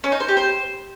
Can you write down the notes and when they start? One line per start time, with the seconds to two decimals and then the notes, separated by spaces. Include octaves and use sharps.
0.04 C#4
0.12 D#4
0.20 C5
0.29 G4
0.37 C5